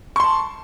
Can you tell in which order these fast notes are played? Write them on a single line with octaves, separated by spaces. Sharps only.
C#6 C6 A5